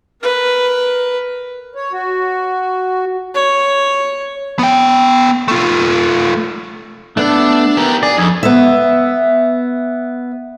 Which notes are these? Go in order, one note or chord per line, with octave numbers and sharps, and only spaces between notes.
A#4 B4
C#5
F#4
C#5
B3 G5
A3 F4
A3 B3 D4 A4
B3 G4 A#4
G#4 D5
F2 D#4 G#4 A4
B3 E5